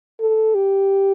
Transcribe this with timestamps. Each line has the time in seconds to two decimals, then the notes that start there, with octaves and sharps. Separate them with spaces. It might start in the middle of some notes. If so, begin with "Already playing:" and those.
0.20 A4
0.55 G4